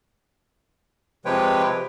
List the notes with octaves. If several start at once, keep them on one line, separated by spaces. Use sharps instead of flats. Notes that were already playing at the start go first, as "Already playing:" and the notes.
C3 F3 G#3 B4 C#5 G5